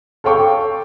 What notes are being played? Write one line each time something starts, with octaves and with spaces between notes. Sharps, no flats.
A4 C#5 F5 G5 C#6 D6